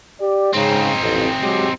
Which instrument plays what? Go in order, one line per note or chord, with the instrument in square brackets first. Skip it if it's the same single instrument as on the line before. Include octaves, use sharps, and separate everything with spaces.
[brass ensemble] G4 D5
[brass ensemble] G#2 C#3 [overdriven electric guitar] C4 D#4
[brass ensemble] A1 F2
F#3 G#3 G4